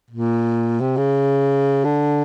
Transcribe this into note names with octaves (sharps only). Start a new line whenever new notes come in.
A#2
C3
C#3
D3